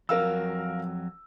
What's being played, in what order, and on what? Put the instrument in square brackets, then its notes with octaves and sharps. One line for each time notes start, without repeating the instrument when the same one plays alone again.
[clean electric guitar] F2 F#3 [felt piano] A#4 F5 E6